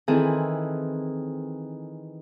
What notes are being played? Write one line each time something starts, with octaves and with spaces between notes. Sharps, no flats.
D#3 E3 C4 E4 G#4 A4